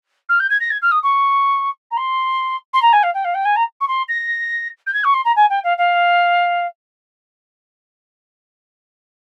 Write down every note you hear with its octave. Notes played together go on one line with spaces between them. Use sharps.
F6
G6
G#6
A#6
G#6
F6
D#6
C#6
A#5
C6
C6
A#5
G#5
F5
G5
F5
G5
G#5
A#5
C#6
C6
A#6
G6
G#6
C#6
C6
A#5
G#5
G5
F5
F5